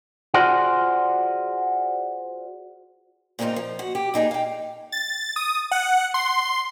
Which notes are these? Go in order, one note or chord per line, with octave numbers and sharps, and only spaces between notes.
F4 F#4 G#4 C5 D5 F#5
A#2 C#3 C4 D4 D#4 F4
F3
F#4
G4
A#2 D#4 G#4 A#5
F5 G5
A6
D#6
F#5
C6